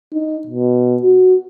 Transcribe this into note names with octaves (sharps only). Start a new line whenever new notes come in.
D#4
B2
F#4